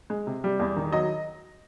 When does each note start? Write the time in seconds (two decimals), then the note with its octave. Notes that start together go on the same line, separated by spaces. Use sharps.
0.10 G#3
0.27 C3
0.44 G3
0.60 E2
0.76 D#3
0.92 F#3 D#5